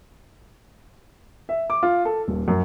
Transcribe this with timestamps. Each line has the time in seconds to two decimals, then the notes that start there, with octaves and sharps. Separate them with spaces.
1.49 E5
1.70 D6
1.83 F4
2.05 A4
2.28 D#1
2.48 F#2